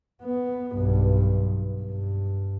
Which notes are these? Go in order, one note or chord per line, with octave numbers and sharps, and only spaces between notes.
B3
B1 G2
G2